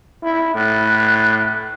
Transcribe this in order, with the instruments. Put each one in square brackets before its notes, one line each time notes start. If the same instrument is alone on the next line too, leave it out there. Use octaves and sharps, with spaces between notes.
[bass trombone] E4
[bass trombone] A2 [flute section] F#6